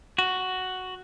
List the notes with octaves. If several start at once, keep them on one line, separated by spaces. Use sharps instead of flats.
F#4